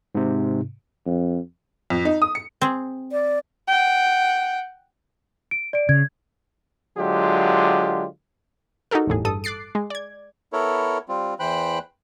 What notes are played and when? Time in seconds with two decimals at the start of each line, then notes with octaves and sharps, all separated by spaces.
0.15 G#2 C3
1.06 F2
1.90 F2
2.05 D#4
2.22 D#6
2.35 C#7
2.61 C4 G#4
3.12 D5
3.67 F#5 G5
5.51 D7
5.73 D5 D7
5.89 C#3 G#6
6.98 D3 F#3 G#3 F4 G4
8.91 D#4 F#4 G4 A4 A#4
9.07 G1 E2 A2 G#4
9.25 G2 A4 D#6
9.44 D6 F#6 A6 C7 D7
9.75 G#3
9.90 D5 G#6
10.53 B3 E4 A4 A#4 C#5
11.09 G3 C4 F4
11.39 E2 E3 C5 G5 B5 F#6